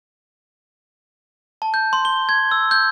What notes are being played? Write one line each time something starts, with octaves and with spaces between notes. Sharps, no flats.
A5
G6
C6
G7
G#6
E6
G6